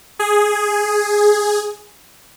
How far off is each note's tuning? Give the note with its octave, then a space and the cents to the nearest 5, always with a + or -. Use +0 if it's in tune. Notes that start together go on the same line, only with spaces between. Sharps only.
G#4 +0